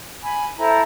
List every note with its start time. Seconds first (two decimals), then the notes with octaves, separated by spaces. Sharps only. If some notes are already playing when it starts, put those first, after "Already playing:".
0.23 G#5 B5
0.58 E4 A4 C5 A#5